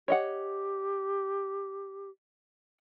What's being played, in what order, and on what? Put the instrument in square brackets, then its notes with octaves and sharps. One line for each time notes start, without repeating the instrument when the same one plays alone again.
[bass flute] G4 [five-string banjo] C#5 D#5 F#5